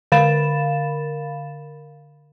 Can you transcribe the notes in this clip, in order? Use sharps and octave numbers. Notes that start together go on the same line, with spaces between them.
D3 A#4 F5 B5 A6 E7